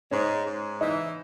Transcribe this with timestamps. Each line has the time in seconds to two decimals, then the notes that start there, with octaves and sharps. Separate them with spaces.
0.11 G#2 C#4
0.46 G#2
0.81 E3 D#4